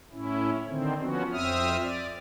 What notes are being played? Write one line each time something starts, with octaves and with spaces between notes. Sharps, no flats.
A2 C#4 E4
D3 D#3 C4
F3 B3 C#4 F#4
F2 C4 E5 D#6 F6
D5